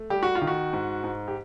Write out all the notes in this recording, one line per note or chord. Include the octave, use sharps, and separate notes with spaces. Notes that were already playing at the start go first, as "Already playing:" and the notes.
Already playing: A3
G3 G4
F#4
F4
D#3
F#4
G#2
G#2
G4